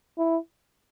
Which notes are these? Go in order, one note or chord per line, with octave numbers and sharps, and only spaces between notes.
E4